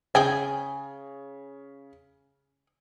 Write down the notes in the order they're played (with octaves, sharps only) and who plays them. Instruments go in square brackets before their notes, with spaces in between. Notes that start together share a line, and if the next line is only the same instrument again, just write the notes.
[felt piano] C#3 [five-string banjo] G#4 G5 G#5